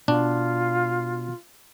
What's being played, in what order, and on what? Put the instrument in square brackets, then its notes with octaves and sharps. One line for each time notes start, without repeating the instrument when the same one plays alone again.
[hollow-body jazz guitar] B2 [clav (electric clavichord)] D4 [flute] F4